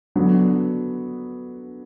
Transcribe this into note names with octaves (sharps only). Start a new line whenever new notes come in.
D3 F#3 B3 D4